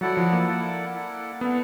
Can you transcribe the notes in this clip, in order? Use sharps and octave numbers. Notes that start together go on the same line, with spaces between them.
F#3 E4 A4 D5 F#5
F3
A#3
E4 A4 D5 F#5
E4 A4 D5 F#5
B3 E4 A4 D5 F#5